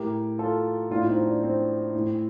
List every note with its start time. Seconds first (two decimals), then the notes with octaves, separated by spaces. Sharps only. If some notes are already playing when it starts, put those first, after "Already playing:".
Already playing: A2 G4 A#4
0.38 F4 A4
0.90 A2 D4 F4
1.08 C4 D#4
1.26 D4
1.43 C4
1.95 A2